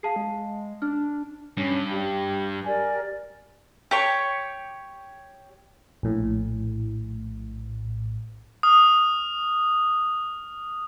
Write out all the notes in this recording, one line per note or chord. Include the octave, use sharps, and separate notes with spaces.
G#4 F5 A5 C7
G#3
D4 F6
G2 C#4
G4
G4 A#4 D5 G#5
G4 C#5 C#6
A#1 A2
D#6 F6